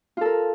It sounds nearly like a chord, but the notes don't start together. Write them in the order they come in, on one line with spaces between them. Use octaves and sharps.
F4 A4 A#4